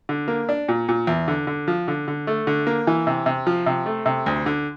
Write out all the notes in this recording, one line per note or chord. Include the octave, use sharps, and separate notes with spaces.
D3
A#3
D4
A#2
A#2
E2
D3
D3
F3
D3
D3
A3
D3
A#3
E3
C3
C3
F3
C3
A3
C3
D2
D3